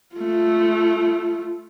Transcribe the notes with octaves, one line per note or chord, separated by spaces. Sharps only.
A3 F4